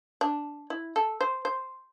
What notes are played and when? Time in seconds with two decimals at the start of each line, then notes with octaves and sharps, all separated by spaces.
0.21 D4
0.70 E4
0.96 A4
1.21 C5
1.45 C5